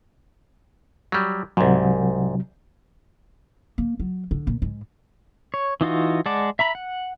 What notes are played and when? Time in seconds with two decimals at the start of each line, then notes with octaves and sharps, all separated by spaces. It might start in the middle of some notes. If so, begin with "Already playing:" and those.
1.12 F#3 G3
1.57 C2 G#2 C3 F#3
3.78 A#3
4.00 F#3
4.31 D3
4.47 A#2
4.62 G#2
5.54 C#5
5.81 E3 D#4 F4 F#4
6.26 G#3 D5 F#5 A5 D6
6.59 E5 A#5 B5
6.75 F#5